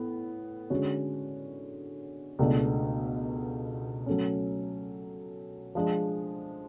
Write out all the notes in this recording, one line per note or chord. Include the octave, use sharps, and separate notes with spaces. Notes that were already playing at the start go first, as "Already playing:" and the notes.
Already playing: A2 B3
D3 G#3 C#4 F#4 C#5
C#2 B2 A3 D4
F#3 A3 C#4
F3 G#3 D4 G#4